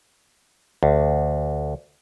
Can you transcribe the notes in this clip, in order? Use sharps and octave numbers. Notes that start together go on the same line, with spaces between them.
D2